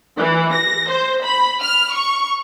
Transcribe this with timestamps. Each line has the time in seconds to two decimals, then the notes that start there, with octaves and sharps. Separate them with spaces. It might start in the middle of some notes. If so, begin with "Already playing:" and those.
0.17 E3
0.53 A#6
0.89 C5
1.24 B5
1.61 F6
1.93 C#6